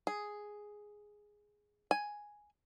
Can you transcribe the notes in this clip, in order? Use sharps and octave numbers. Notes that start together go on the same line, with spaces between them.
G#4
G#5